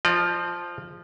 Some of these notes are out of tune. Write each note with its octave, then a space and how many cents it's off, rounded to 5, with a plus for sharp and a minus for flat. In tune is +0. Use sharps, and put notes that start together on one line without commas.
F3 +0 D#5 -45 A#5 +0